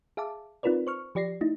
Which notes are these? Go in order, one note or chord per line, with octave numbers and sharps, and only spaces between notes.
G#4 E5 F5 A5 D6
C4 D#4 F4 A#4 B4 D5
C5 C#6 F6
F3 G4 D5 A#6 C7
A3 D#4 E4